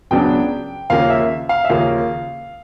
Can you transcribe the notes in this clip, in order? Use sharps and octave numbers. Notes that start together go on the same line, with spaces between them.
C#2 C#3 F#3 B3 D4 G5
D#2 C#3 F3 A#3 C#4 F5
E5
F5
E5
D#2 C#3 F3 A#3 C#4 F5